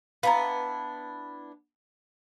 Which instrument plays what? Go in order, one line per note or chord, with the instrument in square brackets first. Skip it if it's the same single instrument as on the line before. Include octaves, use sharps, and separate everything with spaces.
[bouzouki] B3 D4 E4 [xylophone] F5 A#5